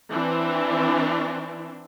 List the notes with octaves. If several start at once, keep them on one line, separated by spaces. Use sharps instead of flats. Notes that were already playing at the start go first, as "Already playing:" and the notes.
E3 C4 D4